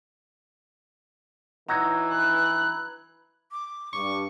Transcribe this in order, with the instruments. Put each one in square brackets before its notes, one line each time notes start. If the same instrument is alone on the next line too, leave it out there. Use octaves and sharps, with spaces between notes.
[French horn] E3 [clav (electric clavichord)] D#4 F#4 C#5 [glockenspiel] A#5 E6 G#6
[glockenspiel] B5 [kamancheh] F#6
[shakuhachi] D6
[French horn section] G2 [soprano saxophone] C#6 [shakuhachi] D6